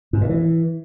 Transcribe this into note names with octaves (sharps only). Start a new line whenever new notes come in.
G#2
A#2
E3